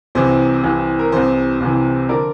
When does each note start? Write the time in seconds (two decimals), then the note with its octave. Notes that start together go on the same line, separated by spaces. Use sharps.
0.15 C2 C3 E3 C5
0.63 C2 C3 E3
0.99 A#4
1.12 C2 C3 E3 C5
1.60 C2 C3 E3
2.09 D3 F3 A#4 D5